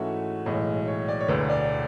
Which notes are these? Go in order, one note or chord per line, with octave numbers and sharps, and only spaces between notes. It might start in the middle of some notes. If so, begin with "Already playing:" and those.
Already playing: G#2 E3 A3 C#4 F#4 E5
B1 A2 E3 G#3
C#5
D5
C#5
E1 D2 D3 B4
D5